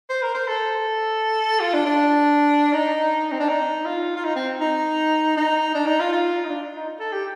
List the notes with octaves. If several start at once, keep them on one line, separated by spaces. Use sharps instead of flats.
C5
A#4
C5
A4
F4
D4
D4
D#4
C4
D4
D#4
F4
F4
D#4
C4
D#4
D#4
D4
D#4
F4
F4
D#4
D4
D#4
A4
G4